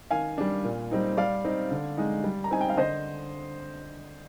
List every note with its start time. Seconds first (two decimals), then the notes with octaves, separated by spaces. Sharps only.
0.10 D#3 F5 G#5
0.38 G3 D4
0.64 A#2
0.91 G3 C4 D#4
1.17 G3 D5 F5
1.45 C4 D#4
1.71 D3
1.97 G#3 D#4
2.24 G3
2.44 A#5
2.51 C4 D#4 G#5
2.61 G5
2.69 F5
2.77 D3 C5 D#5